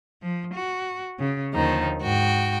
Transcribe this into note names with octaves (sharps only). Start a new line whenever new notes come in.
F3
F#4
C#3
D#2 D3 D#3 F3 D#4
G#2 F#4 G5